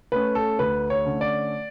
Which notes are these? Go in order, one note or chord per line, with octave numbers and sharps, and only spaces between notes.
A3 C#4 B4
A4
D2 B4
C#5
D3 A3 C#4
D5